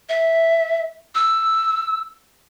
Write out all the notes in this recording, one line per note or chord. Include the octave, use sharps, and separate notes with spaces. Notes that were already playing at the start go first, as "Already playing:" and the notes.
E5
E6